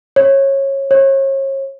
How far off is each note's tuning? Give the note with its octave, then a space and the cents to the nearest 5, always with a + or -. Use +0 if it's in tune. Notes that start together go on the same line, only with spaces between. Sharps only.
C#5 -20
C#5 -35